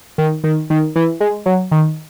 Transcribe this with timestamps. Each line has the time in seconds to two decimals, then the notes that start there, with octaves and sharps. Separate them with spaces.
0.18 D#3
0.44 D#3
0.70 D#3
0.96 E3
1.20 G#3
1.46 F#3
1.71 D#3